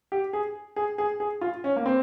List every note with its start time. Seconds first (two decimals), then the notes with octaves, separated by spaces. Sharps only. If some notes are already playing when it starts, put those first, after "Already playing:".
0.12 G4
0.33 G#4
0.76 G#4
0.98 G#4
1.20 G#4
1.41 F4
1.64 C#4
1.76 A#3
1.86 C4